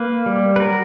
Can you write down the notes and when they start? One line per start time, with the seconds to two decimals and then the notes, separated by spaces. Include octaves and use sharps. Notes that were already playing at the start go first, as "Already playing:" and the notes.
Already playing: A#3 B4
0.26 G3
0.56 B4
0.60 F#3 A#4